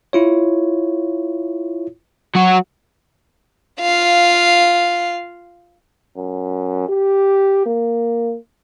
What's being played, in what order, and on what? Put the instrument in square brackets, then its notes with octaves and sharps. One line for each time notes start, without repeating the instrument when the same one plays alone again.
[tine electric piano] E4 F4 C#5
[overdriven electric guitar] F#3 F#4
[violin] F4 F5
[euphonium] F#2
G4
A#3